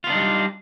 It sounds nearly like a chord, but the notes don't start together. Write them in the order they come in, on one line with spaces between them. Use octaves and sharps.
F4 B3 D4 D#4 G3